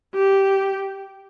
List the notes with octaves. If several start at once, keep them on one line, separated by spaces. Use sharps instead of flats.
G4